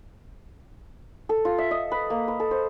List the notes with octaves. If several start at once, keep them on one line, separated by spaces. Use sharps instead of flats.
A4
F4
E5
D#5
B4
A#3
B4
A4
C5